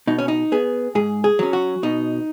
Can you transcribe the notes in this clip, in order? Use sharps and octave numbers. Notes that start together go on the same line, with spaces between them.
B2 D#4
C#4
D#4
B3 G#4
G#2 G#4
G#4
F#3 C#4
F#4
B2 D#4